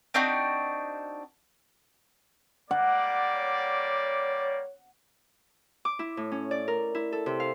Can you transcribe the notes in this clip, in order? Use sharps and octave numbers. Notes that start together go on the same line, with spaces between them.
C4 D4 D#4 F#4
G3 A#3 D5 F#5
C#5
D6
E4
A2
C#4
D5
A#4
E4
A4
C3
F5